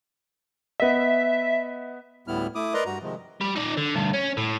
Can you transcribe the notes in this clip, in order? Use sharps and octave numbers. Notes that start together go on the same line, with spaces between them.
B3 D#5 E5
D2 A2 G3 B3 E4 F6
A3 E4 D6 D#6
A#4 B4 D5 D#5 A#5 C6
G2 F#4 A#5
C3 D#3 F3 G#3
G3
D#4 D5
D3
D2 G2
C#4
A2